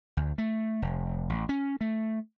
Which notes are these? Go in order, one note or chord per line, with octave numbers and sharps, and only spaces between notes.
D2
A3
F1
A1
C#4
A3